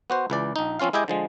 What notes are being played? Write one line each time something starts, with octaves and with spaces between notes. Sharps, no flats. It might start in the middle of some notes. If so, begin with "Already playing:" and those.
B3 F#4 C5
C#2 E3 D5
A#1 D#4
F3 C4 C#4 F4 F5
G#3 E4 G4 D#5 G5 G#5
D3 F3 G#3